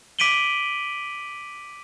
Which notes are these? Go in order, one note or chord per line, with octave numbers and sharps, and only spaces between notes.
D6 B6 D7 D#7 F#7 G7